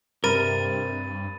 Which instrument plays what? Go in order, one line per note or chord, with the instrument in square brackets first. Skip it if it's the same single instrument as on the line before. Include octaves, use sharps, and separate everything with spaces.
[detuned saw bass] G2 [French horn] C3 [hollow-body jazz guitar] A#4 [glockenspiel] B5 A6 D#7